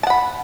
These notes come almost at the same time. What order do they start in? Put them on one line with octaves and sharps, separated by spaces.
A5 F#5 B5